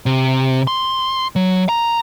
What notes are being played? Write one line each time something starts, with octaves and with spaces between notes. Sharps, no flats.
C3
C6
F#3
A#5